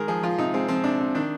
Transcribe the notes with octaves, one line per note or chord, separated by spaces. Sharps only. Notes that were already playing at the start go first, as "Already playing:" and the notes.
Already playing: D#3 G#3 A#4
F3 G#4
F3 F4
C3 D#4
G#3 C4
F3 C4
C3 D4
C3
D#3 D4